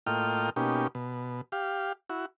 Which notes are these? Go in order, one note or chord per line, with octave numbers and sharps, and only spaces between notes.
A2 A#3 F4 D#5 G5 F6
B2 A#3 C#4 D#4 G4
B2
G4 F5
E4 F#4